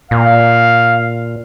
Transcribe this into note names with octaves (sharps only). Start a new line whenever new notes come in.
A#2 F5